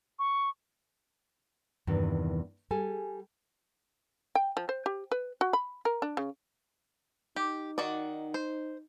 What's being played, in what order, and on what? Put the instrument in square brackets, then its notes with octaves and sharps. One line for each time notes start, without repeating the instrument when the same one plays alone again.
[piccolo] C#6
[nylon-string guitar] E2 G2 C3 D#3
G3 G#4 A4 G#5
[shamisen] G5
F3
C5
G4
B4
F#4
B5
A#4
D4
C#3
[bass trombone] D#4 [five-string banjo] G4
[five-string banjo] D#3 F#4 D5
C5